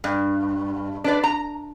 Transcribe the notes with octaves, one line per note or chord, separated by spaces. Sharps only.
G2
D4 B4 D5
A#5